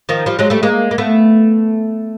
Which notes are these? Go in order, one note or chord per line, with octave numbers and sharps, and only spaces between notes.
D#3 F3
F3 G3
F#3 G#3
G3 A3
G#3 A#3
A#3
A3 B3